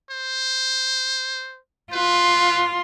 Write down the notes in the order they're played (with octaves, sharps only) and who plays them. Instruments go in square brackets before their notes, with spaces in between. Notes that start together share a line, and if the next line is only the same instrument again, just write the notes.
[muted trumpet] C5
[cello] F4 [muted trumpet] B4